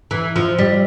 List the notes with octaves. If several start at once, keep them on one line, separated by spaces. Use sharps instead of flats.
E3
F3
G3